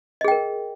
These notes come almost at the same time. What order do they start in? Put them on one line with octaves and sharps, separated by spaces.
D#5 G#4 G5 A#4